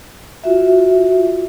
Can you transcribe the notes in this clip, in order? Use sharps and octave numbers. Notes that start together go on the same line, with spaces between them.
F4 F#4 E5